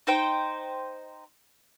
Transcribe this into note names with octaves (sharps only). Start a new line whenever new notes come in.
D#4 C5 G5